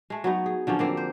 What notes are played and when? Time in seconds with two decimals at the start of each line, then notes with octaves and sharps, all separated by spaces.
0.10 G#3 A3
0.24 F#3 B3 D#4
0.46 G#4
0.67 D3 F3 F#3 C#4
0.79 D3 A#3 C4
0.97 C5